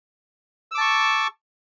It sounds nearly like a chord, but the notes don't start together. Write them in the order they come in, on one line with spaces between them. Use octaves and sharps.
E6 D6 A5 C#6